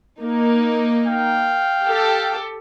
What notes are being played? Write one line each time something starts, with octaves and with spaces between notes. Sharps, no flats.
A#3 D#4
F5 G5
G4 A4